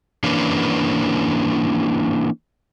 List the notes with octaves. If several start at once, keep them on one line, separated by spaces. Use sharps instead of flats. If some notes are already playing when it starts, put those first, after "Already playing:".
E3 A#3 C#4 D4 B4